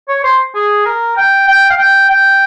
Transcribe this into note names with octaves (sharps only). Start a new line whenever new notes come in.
C#5
C5
G#4
A#4
G5
G5
F5
G5
G5